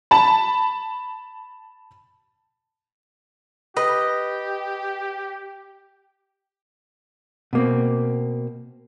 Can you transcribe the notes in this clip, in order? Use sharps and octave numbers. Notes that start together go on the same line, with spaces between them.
A5 B5
G4 B4 D#5
B2 A#3 C4